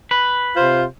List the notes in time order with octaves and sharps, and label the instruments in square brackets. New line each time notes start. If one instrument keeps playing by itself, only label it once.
[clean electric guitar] B4
[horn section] C3 F4 C5